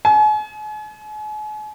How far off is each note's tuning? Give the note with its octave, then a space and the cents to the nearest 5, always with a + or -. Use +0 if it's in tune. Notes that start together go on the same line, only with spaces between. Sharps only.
G#5 +40